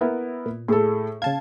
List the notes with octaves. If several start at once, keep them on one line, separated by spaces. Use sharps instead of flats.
B3 E4 A#4
A#2
A2 G#4 A4
C#3 F5 A5 G#6